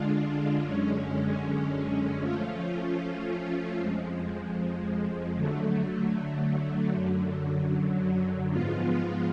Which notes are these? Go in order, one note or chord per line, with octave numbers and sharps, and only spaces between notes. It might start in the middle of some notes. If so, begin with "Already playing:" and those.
Already playing: D3 G#3 D4 F4
F#2 D3 G#3 C#4
F3 A3 C#4 F4
F2 F3 G#3
D3 F#3 A3
F#2 D3 F#3
G#2 F3 G#3 B3 F4